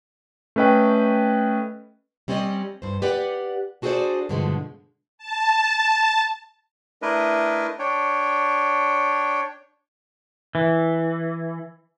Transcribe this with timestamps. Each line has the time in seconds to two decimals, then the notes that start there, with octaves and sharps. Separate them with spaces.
0.56 A3 C#4 B4 D#5 G5
2.28 G3 C4 C#4 D5 D#5
2.82 G2 C5
3.02 G4 B4 D5 F#5
3.82 D4 F#4 G#4 A4 C5 D5
4.29 G2 B2 D3 F3 G#3
5.18 A5
7.02 A3 D4 E4 A#4 B4 D#5
7.79 D4 C#5 G5
10.55 E3